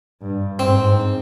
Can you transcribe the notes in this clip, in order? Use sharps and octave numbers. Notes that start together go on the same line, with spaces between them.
G2
G#2 C4